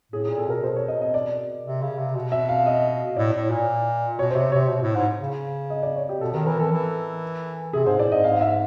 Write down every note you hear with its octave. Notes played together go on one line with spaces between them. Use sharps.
A2 G#4
A#2 G#4
A4
B2 A#4
B2 C5
C#5
D#5
D#5
D5
C3
C#3
C3
B2
E5
F5
D#5
A2 D5
A2
A#2
B2 C#5
C5
C3 C#5
C3 C#5
B2
A2
G#2
C#3
D#5
D5
C#5
G4
B2 A4
D#3 A#4
E3 A#4
E3 A4
E3
C3 G#4
G#2 C5
A2 D5
G#2 D#5
G#2 F5
E5